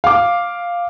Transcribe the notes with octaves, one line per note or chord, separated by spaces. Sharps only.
F5 D6